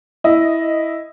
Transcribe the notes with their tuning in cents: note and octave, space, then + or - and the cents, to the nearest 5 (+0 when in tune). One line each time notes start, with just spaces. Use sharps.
E4 -5 D#5 +0